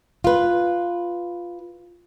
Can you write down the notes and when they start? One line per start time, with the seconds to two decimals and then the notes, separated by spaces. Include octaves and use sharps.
0.24 F4 B4